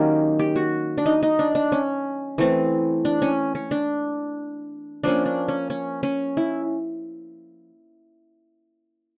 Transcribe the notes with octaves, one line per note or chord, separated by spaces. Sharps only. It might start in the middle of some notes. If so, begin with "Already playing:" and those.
Already playing: D#3 F#3 A#3 C#4 G4
G4
F#4
D4
D#4
D#4
D4
D4
C#4
E3 A3 C4
D4
C#4
C#4
D4
F3 A#3 C#4 D4
D4
C#4
C#4
C#4
E4